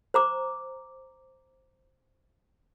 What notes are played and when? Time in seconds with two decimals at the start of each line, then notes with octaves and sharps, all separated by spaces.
0.14 C5 A#5 D6